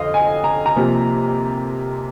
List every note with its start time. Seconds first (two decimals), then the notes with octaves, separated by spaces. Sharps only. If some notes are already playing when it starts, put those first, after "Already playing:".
Already playing: F2 D3 D#5 F5
0.14 G#5
0.44 A#5
0.66 A#5
0.76 C3 F3 A#3